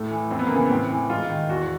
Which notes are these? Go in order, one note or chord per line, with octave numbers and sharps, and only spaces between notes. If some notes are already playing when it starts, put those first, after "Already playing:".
Already playing: A2 A3
E3
F2 C4
B3
A#3
C#3 E3 B3
B3
A2 C4
E3
G#2 F4
D#3
E2 F#4